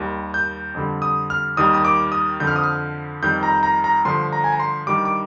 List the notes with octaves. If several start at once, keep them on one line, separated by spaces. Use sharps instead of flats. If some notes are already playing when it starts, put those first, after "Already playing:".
Already playing: D#2 D#3 G3
G6
F2 D3 G3
D#6
F6
D#2 D#3 G3 D#6
D#6
D6
D#6
F2 D3 F3 G6
F6
D#6
F6
F2 D#3 G3 G6
A#5
A#5
A#5
G2 D3 F3 C6
A#5
G#5
A#5
C6
G2 D#3 G3 D6
D6